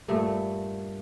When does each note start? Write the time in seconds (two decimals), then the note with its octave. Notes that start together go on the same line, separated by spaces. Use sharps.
0.08 G2 A#2 A3